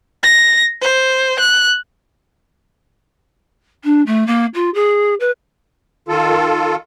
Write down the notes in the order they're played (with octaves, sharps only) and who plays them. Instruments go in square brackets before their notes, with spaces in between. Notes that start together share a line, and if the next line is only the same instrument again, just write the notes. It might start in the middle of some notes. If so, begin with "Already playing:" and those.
[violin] A#6
C5
F#6
[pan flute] D4
A3
A#3
F4
G#4
B4
[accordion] D#3 F4 A4